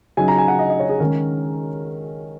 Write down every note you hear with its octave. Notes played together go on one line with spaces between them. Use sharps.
C#3 F#3 D#4 G#5
A#5
G#5
F#5
D#5
D#5
C#5
G#4
D#3 G#3 C#4 A#4